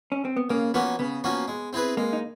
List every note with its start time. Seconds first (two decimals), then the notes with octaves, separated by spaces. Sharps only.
0.12 C#4
0.25 C4
0.36 B3
0.50 C#3 A#3
0.74 F3 A#3 B3 C#4 F#4
0.99 C#3 B3
1.24 F3 A#3 C#4 F#4
1.48 G#3
1.73 C4 E4 G#4 B4
1.97 G#3 A#3
2.13 D#4